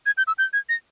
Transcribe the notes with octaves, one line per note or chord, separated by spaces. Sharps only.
G#6
G6
E6
G6
G#6
A#6